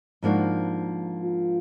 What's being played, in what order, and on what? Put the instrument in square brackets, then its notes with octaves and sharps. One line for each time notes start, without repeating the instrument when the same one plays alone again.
[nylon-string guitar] G#2 F3 A#3 D4 F#4
[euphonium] F4